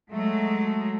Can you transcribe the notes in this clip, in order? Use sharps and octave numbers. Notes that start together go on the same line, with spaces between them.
F#3 G#3 A3